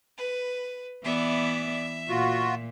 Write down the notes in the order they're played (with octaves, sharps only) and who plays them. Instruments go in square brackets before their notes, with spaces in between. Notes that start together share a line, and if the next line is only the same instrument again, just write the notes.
[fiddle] B4
[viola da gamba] E3 B3 D5 [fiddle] E5
[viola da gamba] A#2 [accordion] F4 F#4